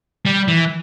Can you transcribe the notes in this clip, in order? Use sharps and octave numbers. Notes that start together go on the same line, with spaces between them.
G3
E3